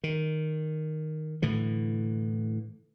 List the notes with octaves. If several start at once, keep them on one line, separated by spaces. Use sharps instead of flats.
D#3
A2 D3 E3